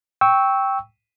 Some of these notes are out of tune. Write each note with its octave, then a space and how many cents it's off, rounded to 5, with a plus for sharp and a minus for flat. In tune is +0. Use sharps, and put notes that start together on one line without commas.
G5 +0 C#6 +0 E6 -15